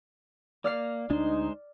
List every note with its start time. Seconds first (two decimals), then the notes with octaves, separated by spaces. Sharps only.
0.64 A#3 D5 F6 C7
1.10 D2 G#3 D4 D#4 C5